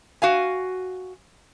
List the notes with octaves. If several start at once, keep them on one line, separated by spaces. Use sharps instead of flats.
F#4 F5 G#5